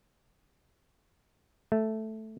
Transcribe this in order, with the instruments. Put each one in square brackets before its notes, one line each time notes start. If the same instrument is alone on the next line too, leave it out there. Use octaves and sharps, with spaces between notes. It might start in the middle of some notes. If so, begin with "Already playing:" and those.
[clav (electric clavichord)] A3